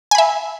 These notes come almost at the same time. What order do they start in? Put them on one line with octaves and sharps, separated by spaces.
G#5 B5 E5